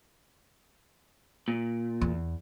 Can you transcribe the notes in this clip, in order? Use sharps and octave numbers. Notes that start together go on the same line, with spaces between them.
A#2
E2